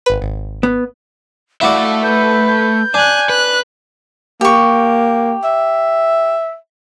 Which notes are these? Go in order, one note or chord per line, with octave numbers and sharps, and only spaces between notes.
G#1 B4
G#1
B3
A3 E4 F#4 D5 E5 F5
B4 G6
G6
D4 G#5 F#6
B4 F#6
A#3 G4 C#6
E5